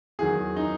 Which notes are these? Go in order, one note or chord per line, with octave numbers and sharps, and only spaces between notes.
E2 D#3 F#3 G#4
D#4